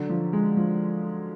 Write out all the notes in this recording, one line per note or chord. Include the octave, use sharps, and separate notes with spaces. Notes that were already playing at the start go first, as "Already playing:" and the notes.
Already playing: D3 F#3
F3
G#3
F3